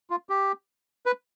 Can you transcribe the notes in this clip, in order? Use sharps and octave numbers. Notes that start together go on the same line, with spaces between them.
F4
G4
B4